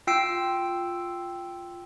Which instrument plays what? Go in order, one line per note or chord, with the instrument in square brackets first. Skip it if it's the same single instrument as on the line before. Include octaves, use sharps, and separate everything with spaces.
[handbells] F4 G5 E6 C7 D7